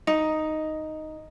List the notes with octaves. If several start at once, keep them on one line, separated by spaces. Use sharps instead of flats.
D#4